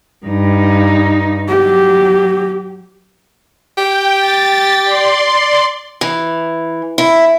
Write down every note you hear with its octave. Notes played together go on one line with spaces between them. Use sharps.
G2 D#4
F#3 G4
G4 G5
A6
D5 C6
E3
E4